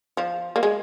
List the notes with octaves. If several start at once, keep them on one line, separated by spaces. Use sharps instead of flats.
F3
A#3
G#3